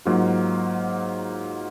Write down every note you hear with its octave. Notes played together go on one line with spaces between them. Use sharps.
G#2 F#3 A#3 F4